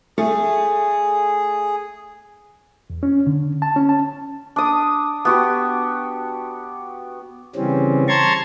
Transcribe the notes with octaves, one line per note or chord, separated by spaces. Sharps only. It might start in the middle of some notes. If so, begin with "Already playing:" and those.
A3 G#4
E2
C#4
D3
A5
C#4
A5
D4 D#6
B3 F#4 G4
C#3 E3 G3 C4 C#4
A5 A#5 C6 C#6 G#6